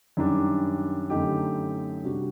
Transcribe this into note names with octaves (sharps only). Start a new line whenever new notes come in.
F#2 D#3 G3 D4
F#2 D3 A3 D#4 G4
C3 G3 D4 F#4